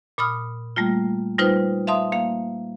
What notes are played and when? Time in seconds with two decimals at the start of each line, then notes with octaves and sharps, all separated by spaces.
0.18 A#2 B5 D#6 F6
0.76 G3 A3 A#3 F4
1.39 G3 D#4 F4 B4 C5 D#6
1.87 E5 F5 A5 C6 D#6
2.12 A#3 F5